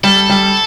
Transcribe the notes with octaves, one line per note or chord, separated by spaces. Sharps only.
G3 A4
G3